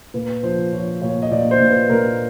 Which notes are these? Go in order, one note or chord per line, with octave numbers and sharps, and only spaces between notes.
A#2 B4
F3 C5
F3 C#5
A#2 C#5
D#5
A#2 D5
C5
A#2
B4
A#2 A#4